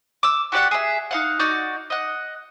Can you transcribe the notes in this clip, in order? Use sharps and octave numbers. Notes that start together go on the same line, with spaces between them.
D6 E6
F#4 G4 D5 F#5
G#4 E5
D#4 F5 F#5
D#4 F#4 D5
D#5 F#5